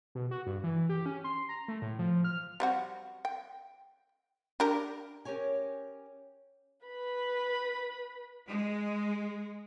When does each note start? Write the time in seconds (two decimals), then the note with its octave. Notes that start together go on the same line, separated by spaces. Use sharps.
0.15 B2
0.31 F#4
0.47 G2
0.64 E3
0.89 G4
1.06 C#4
1.24 C6
1.49 A#5
1.68 A3
1.82 A2
1.99 F3
2.24 F6
2.60 G3 C4 F#4
3.25 G5
4.60 D4 G4 A#4
5.25 C#4 G4 A#4 C#5 G#5
6.86 B4 B5
8.47 G#3